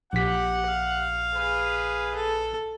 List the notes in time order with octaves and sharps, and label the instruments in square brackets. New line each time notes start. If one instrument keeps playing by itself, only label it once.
[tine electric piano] A#1 B6 [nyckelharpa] G4 [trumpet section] F#5
[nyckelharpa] F5
[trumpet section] G#4 B4
[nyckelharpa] A4